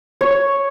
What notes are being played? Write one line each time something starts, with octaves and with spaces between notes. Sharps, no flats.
C#5